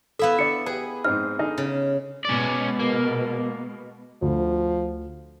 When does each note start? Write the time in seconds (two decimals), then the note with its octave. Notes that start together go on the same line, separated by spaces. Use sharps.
0.19 B3 E4 A4 E5 F5
0.39 D3 D5 C#7
0.66 G4 G#4 B4
1.04 G#2 C4 D#4 F6
1.39 D3 D#4 G#4
1.58 C#3
2.25 B2 G#3 C#4 D5
2.80 A#3
4.22 D2 F3